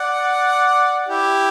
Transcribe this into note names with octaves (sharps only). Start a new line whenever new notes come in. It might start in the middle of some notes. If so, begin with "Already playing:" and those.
Already playing: D5 F#5
E4 G4